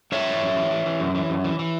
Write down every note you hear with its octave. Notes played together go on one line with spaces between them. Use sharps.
F#2 C#5 E5
E3
F#2
E3
E3
E3
F#2
E3
F#2
E3
E3